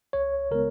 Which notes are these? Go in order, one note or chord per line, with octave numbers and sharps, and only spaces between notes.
C#2 C#5
C#3 G#3 B3 A#4